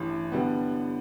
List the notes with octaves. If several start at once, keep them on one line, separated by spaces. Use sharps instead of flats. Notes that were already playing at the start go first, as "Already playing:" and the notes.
Already playing: A1 G2 E3
D3 G3 B3